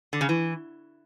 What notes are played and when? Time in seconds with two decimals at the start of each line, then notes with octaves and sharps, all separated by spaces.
0.13 D3
0.21 C#3
0.29 E3